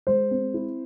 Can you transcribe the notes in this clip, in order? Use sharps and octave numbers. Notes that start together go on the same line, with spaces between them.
G#3 C5
C4
E4